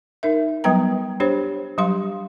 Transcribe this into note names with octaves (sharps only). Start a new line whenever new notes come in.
D#4 A#4 E5
F#3 G3 B3 B4 G5 A#5
D4 G4 C5 C#5
F#3 G3 G4 F5 C6